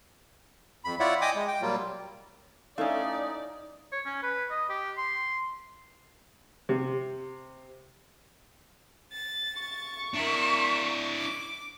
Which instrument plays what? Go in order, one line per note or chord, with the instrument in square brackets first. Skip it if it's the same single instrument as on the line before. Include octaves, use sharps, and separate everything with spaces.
[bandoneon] F2 B5
E4 F4 C#5 D5 E5 F#5
D#5 G5 G#5 D6 D#6
G#3
G5
A#2 F#3 G3 A#3 F4
[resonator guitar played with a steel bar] A3 C#4 [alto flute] D#4 [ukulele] E4 A4 F5 [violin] D5
[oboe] C#5
C#4
B4
D#5
G4
C6
[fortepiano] C3
[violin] A6
[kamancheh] C#6
[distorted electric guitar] D4 E4 [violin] A#4 E5
[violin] D6